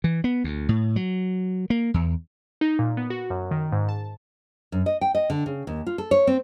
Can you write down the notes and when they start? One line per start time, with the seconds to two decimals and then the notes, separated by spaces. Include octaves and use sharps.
0.04 E3
0.24 B3
0.44 D2
0.69 A2
0.96 F#3
1.70 A#3
1.94 E2
2.61 D#4
2.79 A#2
2.97 B3
3.10 F#4
3.30 F#2
3.51 D#3
3.72 G#2
3.89 A5
4.72 F#2
4.86 D#5
5.01 G5
5.15 D#5
5.30 D3
5.46 C#3
5.67 D#2
5.87 F4
5.98 A4
6.11 C#5
6.27 C4